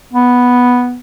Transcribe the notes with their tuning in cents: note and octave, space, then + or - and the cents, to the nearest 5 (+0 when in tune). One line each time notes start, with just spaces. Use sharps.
B3 -5